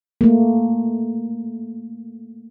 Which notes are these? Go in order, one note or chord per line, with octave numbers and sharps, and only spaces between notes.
A3 A#3